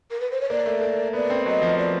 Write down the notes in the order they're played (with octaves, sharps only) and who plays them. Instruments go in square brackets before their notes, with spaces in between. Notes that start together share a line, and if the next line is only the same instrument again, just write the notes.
[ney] A#4
B4
C5
C#5
[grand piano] A#3 [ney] D5
[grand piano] A3
A#3
[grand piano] B3 [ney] D5
[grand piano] C4
[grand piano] F#3 [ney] D#5
[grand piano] F3
[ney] D5